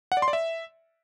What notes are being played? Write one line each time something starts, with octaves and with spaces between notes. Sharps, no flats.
F#5
D5
C6
D5
E5